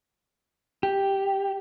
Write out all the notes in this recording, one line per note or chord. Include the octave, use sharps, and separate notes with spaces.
G4